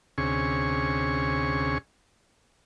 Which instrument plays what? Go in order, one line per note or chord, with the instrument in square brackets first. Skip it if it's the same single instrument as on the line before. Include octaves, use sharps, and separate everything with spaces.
[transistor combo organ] D2 C3 C#4 G#4 C#6